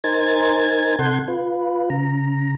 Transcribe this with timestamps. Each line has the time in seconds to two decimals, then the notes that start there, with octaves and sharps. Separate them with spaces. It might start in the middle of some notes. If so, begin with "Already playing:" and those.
0.04 D#4 A#4 C5 G#5 G#6 A6
0.99 C3 A4 F#5 C6 G6 G#6
1.28 F4 B4
1.90 C#3 A#5